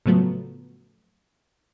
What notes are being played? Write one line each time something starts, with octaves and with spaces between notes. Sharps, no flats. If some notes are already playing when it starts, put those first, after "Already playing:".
A2 C#3 F3 F#3 A3 B3